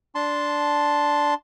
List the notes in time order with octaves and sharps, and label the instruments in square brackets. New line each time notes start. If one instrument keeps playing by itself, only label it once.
[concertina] D4 A5 C6